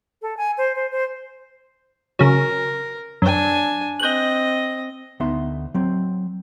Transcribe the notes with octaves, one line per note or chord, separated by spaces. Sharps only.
A4
G#5
C5
C5
C5
C#3 F#3 A#4
F#2 D4 G#5
C4 D#5 F#6 G6
D2 B3 D#4 E5 C6
F#3 C4